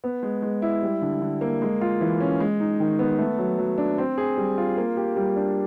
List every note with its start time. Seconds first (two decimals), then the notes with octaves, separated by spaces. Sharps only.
0.04 B3
0.23 G#3
0.42 G#3
0.62 E4
0.82 G3
1.02 D3
1.22 D3
1.41 A#3
1.62 G#3
1.81 F4
2.01 E3
2.20 C#4
2.40 G#3
2.60 D#4
2.80 D#3
2.99 B3
3.19 A3
3.38 F#3
3.59 F#3
3.78 D4
3.98 C4
4.18 G#4
4.37 G3
4.58 F4
4.77 A#3
4.97 G4
5.16 G3
5.36 D4